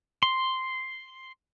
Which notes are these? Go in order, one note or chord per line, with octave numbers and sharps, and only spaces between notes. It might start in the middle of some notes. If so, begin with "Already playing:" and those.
C6